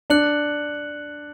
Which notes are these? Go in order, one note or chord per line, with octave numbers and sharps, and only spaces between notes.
D4 F#6 C#7 F#7